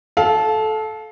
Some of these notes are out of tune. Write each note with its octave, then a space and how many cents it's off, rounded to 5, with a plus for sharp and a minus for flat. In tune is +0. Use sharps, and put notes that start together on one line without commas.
A4 -20 F5 +15